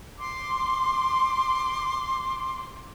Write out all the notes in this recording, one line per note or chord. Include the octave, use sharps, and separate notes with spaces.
C6 D6